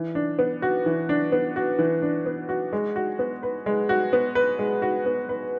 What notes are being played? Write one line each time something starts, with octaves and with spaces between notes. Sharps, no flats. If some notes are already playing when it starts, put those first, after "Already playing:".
Already playing: E3
D4
B3
F#4
E3
D4
B3
F#4
E3
D4
B3
F#4
G#3
F#4
B3
B4
G#3
F#4
B3
B4
G#3
F#4
B3
B4